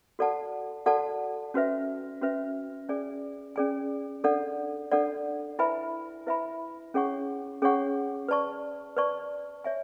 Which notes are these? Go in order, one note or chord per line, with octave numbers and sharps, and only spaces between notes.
F#4 A4 D5 F#5 A5
F#4 A4 D5 F#5 A5
C#4 F#4 B4 E5
C#4 F#4 B4 E5
C#4 G#4 D5 G#5
C#4 G#4 D5 G#5
D4 A4 D5 F#5
D4 A4 D5 F#5
E4 B4 E5 G#5 B5
E4 B4 E5 G#5 B5
C#4 G#4 C#5 F#5 C#6
C#4 G#4 C#5 F#5 C#6
B4 D5 A5 C#6
B4 D5 A5 C#6
C#5 E5 G#5